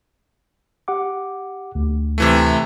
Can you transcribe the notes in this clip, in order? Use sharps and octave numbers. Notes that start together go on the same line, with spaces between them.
G4 F#5 D6
D2
C3 E3 A3